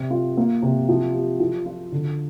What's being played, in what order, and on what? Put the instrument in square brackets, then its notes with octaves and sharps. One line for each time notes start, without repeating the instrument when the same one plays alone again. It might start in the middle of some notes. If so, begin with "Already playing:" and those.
Already playing: [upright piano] C3
F4
A#3
C3
F3
G4
F3
F4
D3